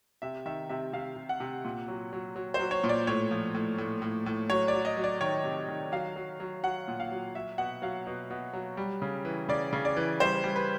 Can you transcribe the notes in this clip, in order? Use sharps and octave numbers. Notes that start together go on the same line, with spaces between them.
C3 E5
D#3 E5
C3 E5
C3 F5
C3
F#5
C3
A#2
F#3
F#3
F#3
C5
F#3
C#5
A#2
D5
A2 C#5
F3
A2
A2
A2
A2
F#3 C#5
D5
F#3
D#5
F#3
D5
D#3 C#5
C3
D#3
F#3 F5
F#3
F#3
F#3 F#5
A#2
F5
F#3
F#3 E5
B2 F#5
F#3 F5
B2
B2
F#3
G3
C#3
E3
C#3 D5
C#3
D5
E3
G3 C5
G3
B4